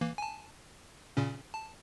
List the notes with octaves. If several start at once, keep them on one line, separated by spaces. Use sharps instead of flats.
E3 A#3
G#5 A5
A#2 C#3 C#4
A5